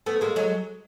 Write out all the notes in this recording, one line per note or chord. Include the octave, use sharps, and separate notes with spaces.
A3 B3
G#3 A#3
F#3 G#3